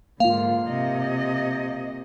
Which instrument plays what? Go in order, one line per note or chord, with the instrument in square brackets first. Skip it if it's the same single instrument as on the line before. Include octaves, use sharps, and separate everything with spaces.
[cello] G#2 D3 [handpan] A#3 F4 [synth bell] F5
[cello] C3 D#5